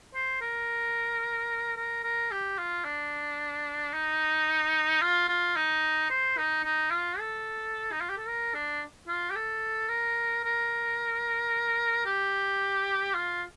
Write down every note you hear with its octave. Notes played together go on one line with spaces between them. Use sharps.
C5
A#4
A#4
A#4
G4
F4
D4
D#4
F4
F4
D#4
C5
D#4
D#4
F4
A4
D#4
F4
G4
A4
A#4
D4
F4
G4
A4
A#4
A#4
G4
F4